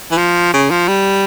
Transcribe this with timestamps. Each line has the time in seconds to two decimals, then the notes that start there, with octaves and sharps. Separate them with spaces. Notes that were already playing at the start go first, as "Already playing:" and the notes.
0.11 E3
0.18 F3
0.54 C#3
0.71 F3
0.88 G3